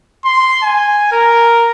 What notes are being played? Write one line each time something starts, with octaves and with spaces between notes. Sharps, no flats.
C6
G#5
A#4